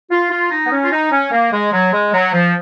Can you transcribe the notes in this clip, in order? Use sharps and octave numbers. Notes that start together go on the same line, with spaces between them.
F4
F4
D#4
B3
C#4
F4
D#4
C#4
A#3
G#3
F#3
G#3
F#3
F3